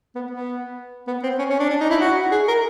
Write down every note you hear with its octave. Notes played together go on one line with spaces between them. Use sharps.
B3
B3
B3
C4
C#4
C#4
D4
D4
D#4
E4
F#4
G#4
A#4